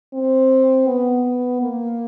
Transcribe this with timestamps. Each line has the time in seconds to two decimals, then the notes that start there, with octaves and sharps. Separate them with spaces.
0.13 C4
0.87 B3
1.61 A#3